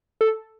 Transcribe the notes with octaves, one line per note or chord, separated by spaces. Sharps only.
A4